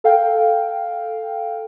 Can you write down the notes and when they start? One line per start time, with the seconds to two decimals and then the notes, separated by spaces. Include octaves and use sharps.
0.04 A4 F5 G5